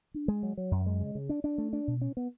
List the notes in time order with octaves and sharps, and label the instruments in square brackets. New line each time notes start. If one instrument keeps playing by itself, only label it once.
[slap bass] D4
G#3
F#3
F#3
F#2
G#3
C#3
C#3
D4
D4
A3
D4
B2
C#4
B3